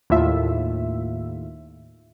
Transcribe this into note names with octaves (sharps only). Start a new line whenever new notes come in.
D#2 A2 F4 E5